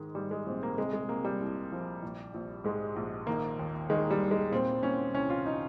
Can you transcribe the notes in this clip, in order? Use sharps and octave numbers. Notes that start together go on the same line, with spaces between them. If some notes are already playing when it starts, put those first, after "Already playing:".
Already playing: G#2 D#3 G#3
G#2 G3
G#3
A#1 C4
A#3
C3 G#3
G#3
C3 A#3
G3
C2
F3
A#1
A#1
G#2 G#3
A#1
D#3 A#3
D#2
D#3 G#3
G3
D#2
G#3
A#2 C4
A#2 C#4
C2 C#4
F4
D#4